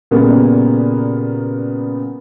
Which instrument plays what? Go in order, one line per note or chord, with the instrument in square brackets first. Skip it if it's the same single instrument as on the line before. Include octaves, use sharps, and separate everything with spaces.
[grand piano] A#2 C#3 G3 A#3 B3